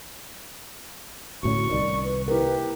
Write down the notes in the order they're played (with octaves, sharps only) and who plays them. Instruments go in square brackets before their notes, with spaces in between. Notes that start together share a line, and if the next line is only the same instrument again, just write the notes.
[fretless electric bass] D2 A2 C#4 [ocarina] F#4 [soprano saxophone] C#6
[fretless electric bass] C2 D#3 [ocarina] D5
[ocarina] B4
[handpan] E4 A#4 [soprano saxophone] G4 [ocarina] B4